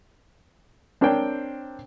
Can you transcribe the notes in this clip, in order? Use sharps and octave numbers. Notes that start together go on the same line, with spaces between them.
C4 D4 A#4 C5 C#5 G5